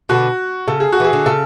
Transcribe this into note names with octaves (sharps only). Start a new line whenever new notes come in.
B2 D3 F#4
C#3 A4
G#4
F#4
E3 G#4
D3
C#3 A4